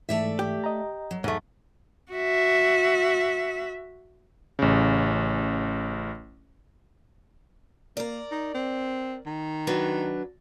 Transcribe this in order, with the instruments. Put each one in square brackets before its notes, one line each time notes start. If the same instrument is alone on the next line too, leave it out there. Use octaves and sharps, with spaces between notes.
[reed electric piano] G#2 E3 [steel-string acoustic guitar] A3 D5 E5
[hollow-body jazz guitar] G4
[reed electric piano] D#5 A#5
[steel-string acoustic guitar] F#3
[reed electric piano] E2 [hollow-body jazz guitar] G#2 A3
[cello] F#4 E5
[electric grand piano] A1 C#3
[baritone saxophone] A#3 [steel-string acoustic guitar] A#4 D5
[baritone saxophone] D#4
C4
D#3
[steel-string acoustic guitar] F#3 D4 B4